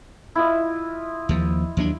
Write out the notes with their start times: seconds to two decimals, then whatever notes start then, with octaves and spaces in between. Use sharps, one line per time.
0.35 E4 F4 D#5
1.29 D#2 F3
1.77 D#2 F#3 D4